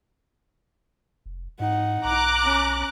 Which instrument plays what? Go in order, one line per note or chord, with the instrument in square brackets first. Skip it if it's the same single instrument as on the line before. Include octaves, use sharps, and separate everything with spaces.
[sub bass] F1
[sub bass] G#2 [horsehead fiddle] D#4 F#5
[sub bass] B1 [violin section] A#5 D6 F#6
[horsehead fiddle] C#4